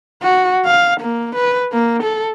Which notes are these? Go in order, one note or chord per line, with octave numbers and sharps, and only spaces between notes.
F#4
F5
A#3
B4
A#3
A4